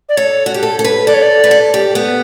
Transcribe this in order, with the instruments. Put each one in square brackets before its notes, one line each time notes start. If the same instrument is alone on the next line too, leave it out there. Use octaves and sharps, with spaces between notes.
[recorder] D5
[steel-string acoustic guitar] A4 [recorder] C#5
[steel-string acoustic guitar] F#4
G4
A4
A4
B4
[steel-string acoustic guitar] A4 [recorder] D5
[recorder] C#5
D5
[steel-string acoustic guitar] B4
A4
G4
B3